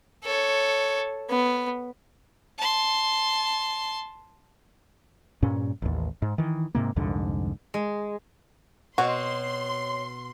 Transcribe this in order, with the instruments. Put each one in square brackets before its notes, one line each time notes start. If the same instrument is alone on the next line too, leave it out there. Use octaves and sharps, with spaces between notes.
[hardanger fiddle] A4 C#5
B3
[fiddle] A5 C6
[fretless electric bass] G2 A#2 C#4
A1 D#2
G#2
D#3 E3
G#2 C3 A#3
C2 F2 G#2 D3
[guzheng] G#3
[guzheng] B2 [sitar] C4 C#5 [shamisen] F#4 [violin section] C6